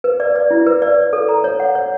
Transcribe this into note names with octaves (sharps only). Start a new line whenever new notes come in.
B4
D5
D5
E4
B4
D5
C#5
A4
A#5
C#5
F#5
C#5